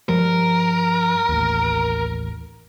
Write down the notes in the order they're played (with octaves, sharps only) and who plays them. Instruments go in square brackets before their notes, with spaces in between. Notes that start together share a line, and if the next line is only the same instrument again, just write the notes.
[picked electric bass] G2 F3 G3 [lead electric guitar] A#4
[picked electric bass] A1 D#2